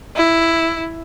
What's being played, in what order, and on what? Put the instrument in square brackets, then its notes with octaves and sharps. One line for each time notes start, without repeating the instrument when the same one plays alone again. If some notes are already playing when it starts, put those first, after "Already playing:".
[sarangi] E4